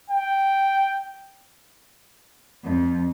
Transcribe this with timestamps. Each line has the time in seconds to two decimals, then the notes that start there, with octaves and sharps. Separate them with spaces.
0.10 G5
2.64 F2